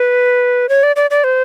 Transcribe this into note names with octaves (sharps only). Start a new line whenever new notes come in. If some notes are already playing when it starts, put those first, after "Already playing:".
Already playing: B4
C#5
D5
D5
D5
C5